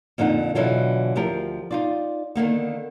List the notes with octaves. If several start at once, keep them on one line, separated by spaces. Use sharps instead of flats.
F2 A#2 D3 D#4 F#5
B2 D3 E3 F#3 F4
D2 F3 G4 A#4
D#4 F4 D5
D3 D#3 A#3 B3